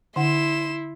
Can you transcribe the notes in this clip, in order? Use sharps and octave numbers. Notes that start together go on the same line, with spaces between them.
D3 E4 F#5 C6 E7